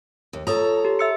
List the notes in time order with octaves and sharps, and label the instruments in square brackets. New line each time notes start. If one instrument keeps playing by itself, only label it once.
[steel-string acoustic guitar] D#2
[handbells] F4 D#6 [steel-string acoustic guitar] A4 C#5 A#5
[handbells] G4
E5 E6 C#7